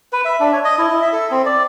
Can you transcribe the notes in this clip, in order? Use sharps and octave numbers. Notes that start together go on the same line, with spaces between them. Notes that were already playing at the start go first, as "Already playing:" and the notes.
B4
E5
D4
C#5
D#5
E4
E4
E5
A4
C4
D5